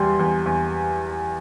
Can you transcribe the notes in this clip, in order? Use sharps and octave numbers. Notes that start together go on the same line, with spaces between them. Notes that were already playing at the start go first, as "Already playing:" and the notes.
Already playing: E2 G3 C6
E2
E2